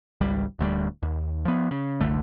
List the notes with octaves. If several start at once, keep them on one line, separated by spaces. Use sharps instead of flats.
G#1 C#2 G3
D1 D2 F3 G3
D#2
F3 B3
C#3
F#1 C2 D3 A3